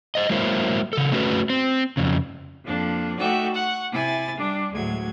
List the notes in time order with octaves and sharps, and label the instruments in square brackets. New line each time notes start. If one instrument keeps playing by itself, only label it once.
[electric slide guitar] C5 D#5
F#3 G#3 A#3 E4 C5
C#3 A4
A3 C#4 D4 F#4 G#4 B4
C4
F2 C#3
[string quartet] F2 F3 A#3 D4
A3 D#4 F#4 D5 E5 G5
F#5 C#6
C3 E4 G#5 A6
G3 D4
D2 A2 F#3 G#3 G#6